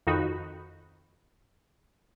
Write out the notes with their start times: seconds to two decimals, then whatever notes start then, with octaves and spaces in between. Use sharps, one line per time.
0.07 F2 D#3 D#4 F#4 B5